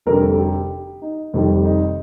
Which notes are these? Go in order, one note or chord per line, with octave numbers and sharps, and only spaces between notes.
F1 F2 D3 G3 A#4
A4
G4
D#4
F1 F2 D#3 G3
D#4